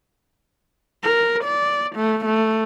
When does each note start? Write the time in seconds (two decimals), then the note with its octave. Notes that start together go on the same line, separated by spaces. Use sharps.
1.03 A#4
1.44 D5
1.96 A3
2.25 A3